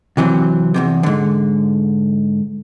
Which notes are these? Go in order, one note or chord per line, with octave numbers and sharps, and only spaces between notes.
C3 E3 F#3 C4
E2 G2 C3
G#2 D3